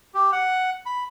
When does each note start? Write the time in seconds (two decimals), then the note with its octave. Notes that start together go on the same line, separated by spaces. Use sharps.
0.14 G4
0.32 F#5
0.86 B5